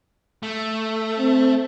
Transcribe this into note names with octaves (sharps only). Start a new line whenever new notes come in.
A3
C4